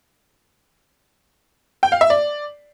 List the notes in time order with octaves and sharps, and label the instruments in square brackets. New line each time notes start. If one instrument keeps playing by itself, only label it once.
[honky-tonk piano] G5
F5
E5
D5